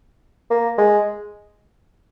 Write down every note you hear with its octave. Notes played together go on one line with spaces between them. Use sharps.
A#3
G#3